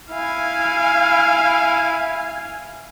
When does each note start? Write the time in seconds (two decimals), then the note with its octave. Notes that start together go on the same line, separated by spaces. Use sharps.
0.11 E4 F5 G#5